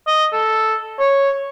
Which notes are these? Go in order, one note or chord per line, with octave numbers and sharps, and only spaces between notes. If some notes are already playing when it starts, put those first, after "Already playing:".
D#5
A4
C#5